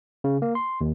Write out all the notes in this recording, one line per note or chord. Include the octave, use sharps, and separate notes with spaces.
C#3
A#3
C6
D#2